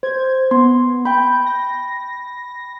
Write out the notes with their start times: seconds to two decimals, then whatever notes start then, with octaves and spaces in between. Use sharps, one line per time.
0.03 C5 G#6
0.51 B3 C6
1.05 G5 B5 G6
1.46 A#6